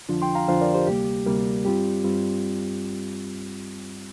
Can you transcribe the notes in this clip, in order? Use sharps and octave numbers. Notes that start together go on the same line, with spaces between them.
F2 D3 F3 D4 F4
G5 C6
F5 A#5
F2 D3 F3 D4 F4 C5 F5
A#4 D5
G4 C5
D2 C3 G3 A#3 G4
D2 C3 G3 A#3 A#4
G2 G3 C4 F4 G4
G2 G3 C4 F4